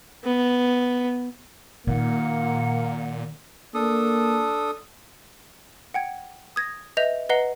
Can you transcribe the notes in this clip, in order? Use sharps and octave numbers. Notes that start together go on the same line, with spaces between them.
B3
A#2 D#3 A#3 F#5
A#3 D4 A4 D#6
F#5 G5 G#6
D#6 G#6 A#6
B4 D#5 E5 G6 F7
B4 D#5 F#5 A#5 C7 G7